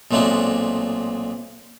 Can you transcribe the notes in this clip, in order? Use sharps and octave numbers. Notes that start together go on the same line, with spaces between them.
B1 A#2 G#3 A3 C4 D4